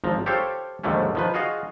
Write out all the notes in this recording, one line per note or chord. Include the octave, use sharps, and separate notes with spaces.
G#1 F3 A#5
G4 A4 C5 C#5 F5 G5
D#2 G#2 D3 F3 A3 C#4
D#3 F3 B4
F4 F#4 G#4 D#5 F5